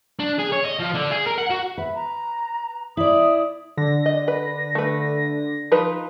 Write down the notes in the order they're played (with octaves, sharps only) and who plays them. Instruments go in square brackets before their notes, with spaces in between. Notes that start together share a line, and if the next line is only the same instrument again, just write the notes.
[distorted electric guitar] D4
G#4
C#5
D#5
F3
D3
G#4
A#4
F#5
F#4
[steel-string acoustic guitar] B4 [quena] E5
[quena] A#5
[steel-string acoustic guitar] E4 D5 [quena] D#6
[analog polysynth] D3 A#6
[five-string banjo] D#5
B4
A3 B4
F3 D#4 B4